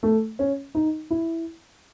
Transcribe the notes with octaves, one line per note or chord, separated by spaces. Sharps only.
A3
C#4
D#4
E4